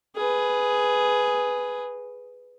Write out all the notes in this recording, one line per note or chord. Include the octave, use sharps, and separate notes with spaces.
G#4 B4